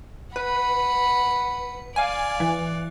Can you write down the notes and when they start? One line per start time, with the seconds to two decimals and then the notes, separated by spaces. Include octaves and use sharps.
0.36 B4 F#5 B5
1.96 D5 F5 G#5
2.40 E3